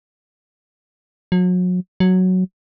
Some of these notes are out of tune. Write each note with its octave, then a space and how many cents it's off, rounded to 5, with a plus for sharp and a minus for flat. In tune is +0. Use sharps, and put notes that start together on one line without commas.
F#3 -35
F#3 +0